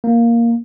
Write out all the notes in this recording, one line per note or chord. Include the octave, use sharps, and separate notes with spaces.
A#3